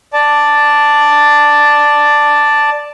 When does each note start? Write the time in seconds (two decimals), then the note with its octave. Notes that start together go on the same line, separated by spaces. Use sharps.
0.13 D5 A5